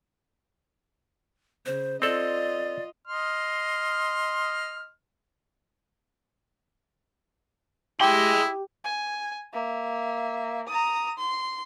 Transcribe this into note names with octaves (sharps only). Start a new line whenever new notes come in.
C#3 C5
C4 F4 A4 D5 D#5
D#5 C6 F6
E4 G4 G#4 C6
G#5
A#3 E5
A#5 D#6
C6